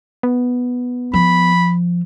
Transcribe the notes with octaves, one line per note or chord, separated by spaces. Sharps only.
B3
F3 B5